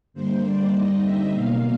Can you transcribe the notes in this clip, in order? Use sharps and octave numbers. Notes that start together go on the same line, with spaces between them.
G2 D3 G3 A#3 C5
D5
D3 G3 C4 D#4 D#5
E5
B2 F#3 A#3 F5